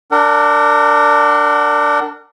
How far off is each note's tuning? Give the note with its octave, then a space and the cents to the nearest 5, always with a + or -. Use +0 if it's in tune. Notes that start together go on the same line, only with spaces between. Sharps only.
D4 +0 A#4 -30 F#5 +30